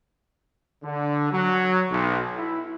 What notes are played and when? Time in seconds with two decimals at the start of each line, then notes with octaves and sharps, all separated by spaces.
0.83 D3
1.32 F#3
1.90 B1
2.37 E4